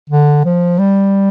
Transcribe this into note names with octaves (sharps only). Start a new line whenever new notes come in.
D3
F3
G3